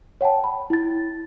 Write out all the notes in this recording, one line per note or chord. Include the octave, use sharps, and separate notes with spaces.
C#5 F#5 G5 A5
B5
E4 A6